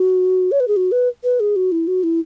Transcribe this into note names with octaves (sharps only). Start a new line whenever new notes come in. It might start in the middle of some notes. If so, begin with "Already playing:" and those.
Already playing: F#4
C#5
B4
G#4
F#4
B4
B4
G#4
F#4
E4
F#4
E4